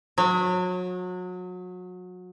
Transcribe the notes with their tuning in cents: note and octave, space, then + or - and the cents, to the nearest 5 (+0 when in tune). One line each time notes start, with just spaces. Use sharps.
F#3 -30